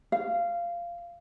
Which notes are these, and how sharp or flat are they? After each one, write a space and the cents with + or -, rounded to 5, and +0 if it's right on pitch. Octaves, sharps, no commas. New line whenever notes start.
F5 -15